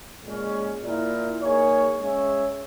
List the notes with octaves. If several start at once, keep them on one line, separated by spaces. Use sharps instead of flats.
A#2 G#3 C#4
A#2 A#3 E4 A#4
A#3 D#4 G#4 C#5
G#3 C#4 G#4 C#5 E5